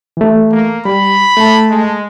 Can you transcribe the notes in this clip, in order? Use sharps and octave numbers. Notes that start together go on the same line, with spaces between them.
E3 A3
A#3
G3 B5
A3 A5
G#3